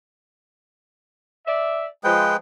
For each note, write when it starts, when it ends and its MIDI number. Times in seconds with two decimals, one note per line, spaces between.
1.46 1.86 74
1.46 1.86 76
2.04 2.34 53
2.04 2.37 56
2.04 2.37 71
2.04 2.37 79